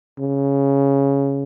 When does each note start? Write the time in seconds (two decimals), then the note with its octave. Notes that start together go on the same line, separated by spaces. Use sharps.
0.19 C#3